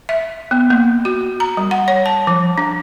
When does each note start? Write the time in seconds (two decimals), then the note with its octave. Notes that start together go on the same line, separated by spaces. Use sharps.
0.09 E5
0.51 B3
0.70 A#3
1.05 F#4
1.40 A#5
1.57 G3
1.71 F#5
1.88 C#5
2.06 A5
2.27 F3
2.58 D4